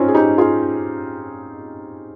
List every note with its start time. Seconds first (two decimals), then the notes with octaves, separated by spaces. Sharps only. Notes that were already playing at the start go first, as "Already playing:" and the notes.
Already playing: C4 C#4 D#4 F4
0.08 G#4
0.15 D#4 G4
0.38 F4 G#4